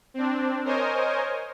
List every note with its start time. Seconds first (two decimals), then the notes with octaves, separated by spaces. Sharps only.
0.14 C4 D4
0.64 A#4 C5 C#5 D#5 G#5